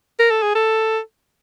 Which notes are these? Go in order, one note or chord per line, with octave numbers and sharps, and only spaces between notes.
A#4
A4
G#4
A4